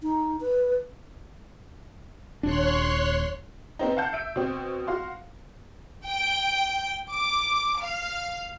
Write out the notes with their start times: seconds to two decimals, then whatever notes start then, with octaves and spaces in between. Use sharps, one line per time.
0.03 D#4
0.41 B4
2.43 D#1 D4 C#5 C6 F#6
3.79 B3 C4 D#4
3.97 F5 F#5 A5 G6
4.13 E5 D7
4.36 B2 C4
4.87 F#4 F5 C6
6.06 G5
7.13 D6
7.82 F5